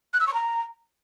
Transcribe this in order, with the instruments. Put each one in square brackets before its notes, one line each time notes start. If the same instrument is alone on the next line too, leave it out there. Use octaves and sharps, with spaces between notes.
[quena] F#6
E6
C#6
A#5